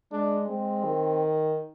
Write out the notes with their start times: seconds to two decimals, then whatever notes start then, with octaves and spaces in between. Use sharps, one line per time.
0.12 G#3 D4
0.48 G#3 C4
0.84 D#3